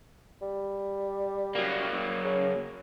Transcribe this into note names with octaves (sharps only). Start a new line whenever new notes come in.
G3
F#3 A#3
C#3